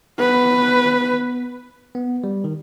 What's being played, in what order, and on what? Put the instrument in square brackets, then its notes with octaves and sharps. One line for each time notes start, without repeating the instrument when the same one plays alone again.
[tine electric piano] B3 [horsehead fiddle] B4
[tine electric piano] B3
G3
D#3